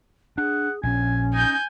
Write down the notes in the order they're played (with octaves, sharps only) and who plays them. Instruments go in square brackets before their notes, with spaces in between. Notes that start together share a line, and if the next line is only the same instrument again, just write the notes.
[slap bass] D4 [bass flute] G#4 [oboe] F#5
[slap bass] A#1 [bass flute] C#4 [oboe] G#5
[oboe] D#4 [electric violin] G#5 G6